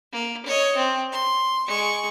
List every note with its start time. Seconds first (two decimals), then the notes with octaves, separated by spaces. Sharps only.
0.12 A#3
0.45 C#5 D#5
0.76 C4
1.12 C6
1.67 G#3 C#6